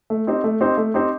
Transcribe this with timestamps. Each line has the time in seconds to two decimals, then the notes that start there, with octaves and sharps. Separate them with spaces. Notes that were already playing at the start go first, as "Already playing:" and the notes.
0.10 A3
0.27 C4 D#4 G4 C5
0.44 A3
0.60 C4 D#4 G4 C5
0.77 A3
0.94 C4 D#4 G4 C5